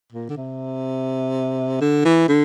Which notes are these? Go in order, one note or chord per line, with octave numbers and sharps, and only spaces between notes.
A#2
D3
C3
D3
E3
D3